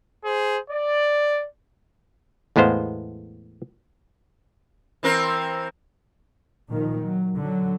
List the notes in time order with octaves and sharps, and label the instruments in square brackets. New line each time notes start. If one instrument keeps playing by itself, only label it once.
[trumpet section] G#4 C5
D5
[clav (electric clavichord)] E2 A2 G#3 B3 C5 F5
[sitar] E3 C4 A#4
[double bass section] A#2 D#3 F3
F#3
D3 F#3